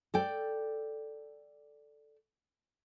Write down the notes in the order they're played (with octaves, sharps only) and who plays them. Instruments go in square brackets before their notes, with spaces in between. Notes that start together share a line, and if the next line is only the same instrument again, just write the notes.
[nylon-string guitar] A4 D5 G5